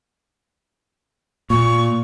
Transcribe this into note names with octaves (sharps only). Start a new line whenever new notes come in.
A#2 C#6